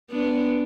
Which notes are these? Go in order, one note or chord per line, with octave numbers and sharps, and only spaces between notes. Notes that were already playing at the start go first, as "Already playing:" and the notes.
B3 D4